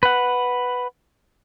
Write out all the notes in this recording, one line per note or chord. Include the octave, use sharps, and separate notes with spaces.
B4 F#5